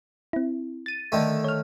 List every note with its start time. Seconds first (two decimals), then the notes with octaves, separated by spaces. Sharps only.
0.33 C4 E4
0.86 A6 D#7
1.12 D3 D#3 A3
1.44 C#5 F6